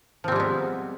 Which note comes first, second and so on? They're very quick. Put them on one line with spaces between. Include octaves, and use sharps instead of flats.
F3 C4 G3 G#3 B3